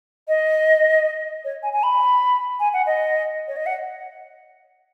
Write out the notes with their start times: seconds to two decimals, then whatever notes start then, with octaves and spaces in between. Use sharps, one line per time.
0.28 D#5
1.45 C#5
1.63 G#5
1.73 G#5
1.83 B5
2.60 G#5
2.73 F#5
2.86 D#5
3.48 C#5
3.57 D#5
3.66 F#5